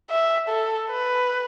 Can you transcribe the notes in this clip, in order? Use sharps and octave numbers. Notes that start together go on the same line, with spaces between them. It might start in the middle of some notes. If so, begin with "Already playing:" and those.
E5
A4
B4